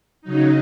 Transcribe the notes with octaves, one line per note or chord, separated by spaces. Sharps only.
C#3 F#3 D#4